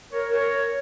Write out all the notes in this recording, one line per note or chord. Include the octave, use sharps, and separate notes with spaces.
A#4 C#5
A#4 C#5